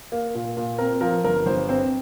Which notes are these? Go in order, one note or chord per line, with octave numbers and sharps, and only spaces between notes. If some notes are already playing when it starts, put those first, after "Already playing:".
A#3
A#2
A#2
C4 A#4
F3 A#4
G1 A#4
G1 C5
C4 C5